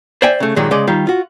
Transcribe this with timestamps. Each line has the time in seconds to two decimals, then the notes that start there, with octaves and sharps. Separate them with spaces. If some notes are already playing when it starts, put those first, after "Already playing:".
0.22 C5 D5 E5 G5 G#5
0.40 C#3 A3
0.56 G2 A#2 D#3 F#3 G#3
0.71 C#3 G#3 D5 D#5
0.87 D#3 G3 F4
1.07 F4 F#4